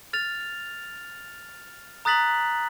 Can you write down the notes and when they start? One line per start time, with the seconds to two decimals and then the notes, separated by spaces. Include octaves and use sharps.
0.13 F6 A6 F7
2.05 A#5 D#6 F#6 A6 B6 F#7